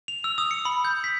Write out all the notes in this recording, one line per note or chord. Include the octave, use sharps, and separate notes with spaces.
F7
E6
D#6
C#7
B5
G6
B6